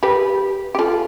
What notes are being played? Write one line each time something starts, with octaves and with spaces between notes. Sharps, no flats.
G4 B4
G4
F4 A4